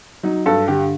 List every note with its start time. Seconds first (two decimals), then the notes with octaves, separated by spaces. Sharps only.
0.23 F#3 D#4
0.46 G2 A4
0.68 D3 G4